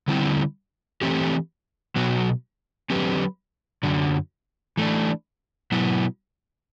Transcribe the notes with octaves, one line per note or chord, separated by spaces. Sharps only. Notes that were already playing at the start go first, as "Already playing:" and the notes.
D3 G3 C4 E4
E3 A3 C4 G4
B2 F#3 B3 F#4
D3 F#3 C4 G4 B4
F#2 D3 F#3
E3 A3 D4
B2 F#3 B3 E4